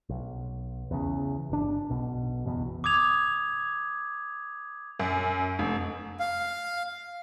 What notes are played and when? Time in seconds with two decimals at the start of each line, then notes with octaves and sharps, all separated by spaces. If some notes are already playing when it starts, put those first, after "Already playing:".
0.09 B1
0.91 E2 C#3
1.50 G1 D4
1.90 B1 B2
2.46 F#1 E2 B2
2.84 D6 D#6 G#6 F7
4.99 F#2
5.59 F1
6.20 F5